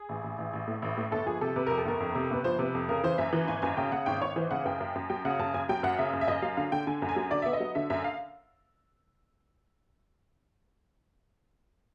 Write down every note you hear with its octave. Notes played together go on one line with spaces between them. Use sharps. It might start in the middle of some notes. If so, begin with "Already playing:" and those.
Already playing: G#4
A1
A1
A1
A1
A2
A1
A2
G1 A4
F3 G#4
C3 A4
C3 B4
F2 A#4
A4
G1 A#4
F2
C3
G1 B4
F3 C5
C3 B4
F2
C#3 A#4
E3 C5
F#2 E5
E3
G#1 G#5
F#2 G#5
C#3 G5
C#3 F#5
G#1 G5
G#1 C#5
E3 C5
C#3 F#5
F#2 G5
F#2
F#2
F#3 G5
C#3 F#5
F#2 A5
F#2 G#5
F#3 G5
F#2 F#5
C#3 E5
F#2
E5
F#2 D#5
F#3 F5
D3 F5
D3 G5
D3 G#5
F#2
G#5
F#3
D3 D5
B3 E5
D#5
F#3
D3 E5
F#2 E5
F5